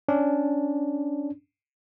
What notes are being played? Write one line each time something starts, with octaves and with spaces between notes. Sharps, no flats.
C#4 D4